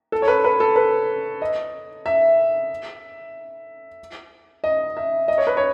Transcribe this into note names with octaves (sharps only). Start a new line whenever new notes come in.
A4
C#5
B4
B4
A4
B4
D#5
E5
D#5
E5
D#5
C#5
B4
C#5